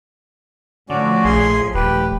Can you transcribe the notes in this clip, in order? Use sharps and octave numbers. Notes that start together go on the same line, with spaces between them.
A2 D3 F3 C#4 F#4 D5
A#1 G#4 G#5 C6
D#1 G4 B4